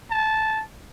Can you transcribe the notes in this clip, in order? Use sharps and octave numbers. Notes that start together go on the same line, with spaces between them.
A5